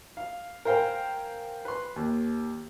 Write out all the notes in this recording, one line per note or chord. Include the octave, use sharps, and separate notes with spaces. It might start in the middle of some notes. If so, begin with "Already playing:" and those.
F5
A#4 C5 F5 G5 G#5
B4 C6
D#2